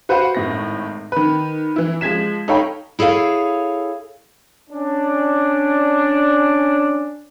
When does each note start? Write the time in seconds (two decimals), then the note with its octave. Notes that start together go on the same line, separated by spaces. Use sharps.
0.09 F#4 B4 C5 F5 F#5
0.35 G#1 A2 A#6
1.12 D#3 B4
1.76 E3 E4
2.01 F3 G#3 G#6 B6 E7
2.48 D#4 A4 C#5 F5 G5 B5
2.99 E4 G#4 A4 C#5 F5
4.71 C#4 D4